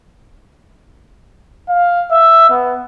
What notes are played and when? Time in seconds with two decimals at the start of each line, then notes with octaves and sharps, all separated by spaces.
1.69 F5
2.11 E5
2.50 B3